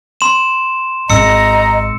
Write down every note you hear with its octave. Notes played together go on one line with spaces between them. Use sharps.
C6 E7
G#1 D#5 A#5 E6 C#7